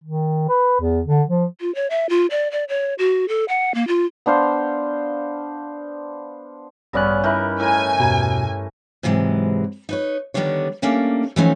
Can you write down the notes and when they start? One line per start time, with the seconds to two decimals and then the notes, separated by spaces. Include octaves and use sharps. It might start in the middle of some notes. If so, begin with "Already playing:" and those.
0.04 D#3
0.49 B4
0.81 E2
1.07 D3
1.28 F3
1.61 F4
1.75 C#5
1.90 E5
2.09 F4
2.31 D5
2.52 D5
2.69 C#5
2.98 F#4
3.28 A4
3.48 F#5
3.74 A#3
3.88 F4
4.26 B3 D4 C5 F5
6.93 A1 G2 C#3 G3 B3 C#4 D5 F#6
7.24 D#3 E3 A#4 E5 B5 F#6 G6
7.60 A2 A#4 G#5
8.00 E2 G2 B2 A#5
9.03 G#2 C3 E3 F#3 G#3
9.89 D#4 B4 C#5
10.34 D3 D#3 G3 B3 D4 C#5
10.82 G3 A3 A#3 C#4 D4
11.36 E3 F3 A3 C4 C#4 D#4